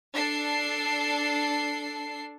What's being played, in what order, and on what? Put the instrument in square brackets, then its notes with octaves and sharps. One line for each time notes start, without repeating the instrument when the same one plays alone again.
[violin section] D4 A4 C7